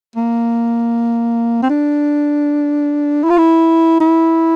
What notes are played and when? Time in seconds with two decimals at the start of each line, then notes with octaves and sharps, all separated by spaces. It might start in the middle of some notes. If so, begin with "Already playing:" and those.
0.16 A#3
1.63 C4
1.70 D4
3.24 E4
3.30 F4
3.38 E4
4.00 E4